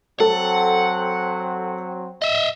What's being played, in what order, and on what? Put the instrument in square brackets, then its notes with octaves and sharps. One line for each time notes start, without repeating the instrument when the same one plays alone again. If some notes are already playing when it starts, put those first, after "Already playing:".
[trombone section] F#3 C4 [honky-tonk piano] A4 [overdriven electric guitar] F#5
[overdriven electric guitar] D#5 E5